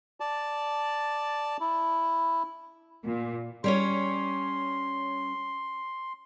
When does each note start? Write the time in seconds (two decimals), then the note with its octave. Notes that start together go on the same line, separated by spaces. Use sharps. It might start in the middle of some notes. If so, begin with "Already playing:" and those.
0.20 D5 A5
1.60 E4
3.04 A#2
3.64 G3 C#4 C#5 C6